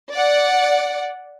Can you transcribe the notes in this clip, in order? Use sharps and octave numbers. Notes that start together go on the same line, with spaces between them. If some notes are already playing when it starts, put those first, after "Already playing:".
D5 F#5